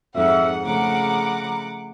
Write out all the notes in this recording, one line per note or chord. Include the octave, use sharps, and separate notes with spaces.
F2 G#2 E5 F#5
C#3 F3 A3 F#5 A#5 B5 D6